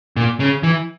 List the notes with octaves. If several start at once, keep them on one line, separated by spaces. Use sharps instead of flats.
A#2
C#3
E3